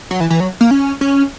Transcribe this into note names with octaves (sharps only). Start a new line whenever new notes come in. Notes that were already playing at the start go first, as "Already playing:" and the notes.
F#3
E3
E3
F#3
A#3
C#4
C#4